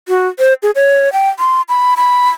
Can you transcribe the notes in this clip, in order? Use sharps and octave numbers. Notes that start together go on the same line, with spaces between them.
F#4
C5
G#4
C#5
G5
C6
B5
B5